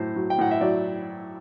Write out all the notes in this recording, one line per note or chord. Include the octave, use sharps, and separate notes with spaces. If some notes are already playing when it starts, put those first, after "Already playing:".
Already playing: A2 F#3 C5
F#3
G5
A2 F#5
E5
F#3 D5